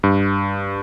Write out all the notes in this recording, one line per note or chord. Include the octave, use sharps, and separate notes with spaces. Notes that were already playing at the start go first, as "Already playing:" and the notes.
G2